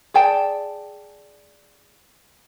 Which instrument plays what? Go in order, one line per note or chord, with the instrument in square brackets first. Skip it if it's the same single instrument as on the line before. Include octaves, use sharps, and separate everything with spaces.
[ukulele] G#4 D5 G5 A5